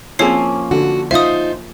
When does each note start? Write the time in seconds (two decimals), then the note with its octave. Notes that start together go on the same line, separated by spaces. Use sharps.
0.19 F3 A#3 C4 C#4 G#4 C#5 E6 C7
0.71 D3 F#4
1.11 D#4 F4 C5 E5 D#6